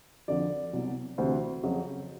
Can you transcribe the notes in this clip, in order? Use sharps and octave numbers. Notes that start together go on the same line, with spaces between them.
F2 D3 F3 D5
C2 B2 F#3
D2 C3 E3 C5
F2 C#3 F#3